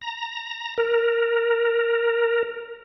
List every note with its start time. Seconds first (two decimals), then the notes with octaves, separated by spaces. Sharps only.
0.01 A#5
0.78 A#4